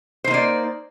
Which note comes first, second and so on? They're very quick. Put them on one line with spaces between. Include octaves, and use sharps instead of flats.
C5 D#4 A#3 D5